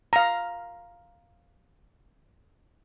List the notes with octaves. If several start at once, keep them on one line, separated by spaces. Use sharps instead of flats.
F5 A#5